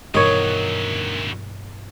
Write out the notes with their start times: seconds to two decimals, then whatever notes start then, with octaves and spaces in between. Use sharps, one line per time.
0.14 D2 G2 B2 D#3 E3 F#3 C#5 D#5